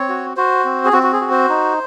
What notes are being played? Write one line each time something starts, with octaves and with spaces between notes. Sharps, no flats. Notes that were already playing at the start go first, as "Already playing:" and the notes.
Already playing: C4 C#5
F#4
F#4 C5
C4
G#4
C4 F#4
F#4
G#4
F#4
C5
D#4